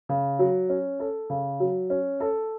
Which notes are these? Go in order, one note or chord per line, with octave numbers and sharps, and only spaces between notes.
C#3
F#3
C#4
A4
C#3
F#3
C#4
A4